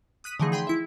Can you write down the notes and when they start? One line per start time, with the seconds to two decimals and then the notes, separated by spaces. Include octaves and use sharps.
0.24 D#6 F#6 B6 D#7
0.40 D3 E3 F3 A3 D#4 G#4
0.52 G#4 G5 B5 C6
0.67 E4 E5